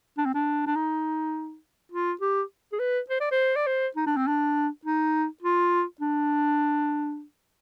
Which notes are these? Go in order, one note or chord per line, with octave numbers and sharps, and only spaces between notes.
D4
C4
D4
D4
D#4
F4
G4
G#4
B4
C5
D5
C5
D5
C5
D#4
D4
C4
D4
D#4
F4
D4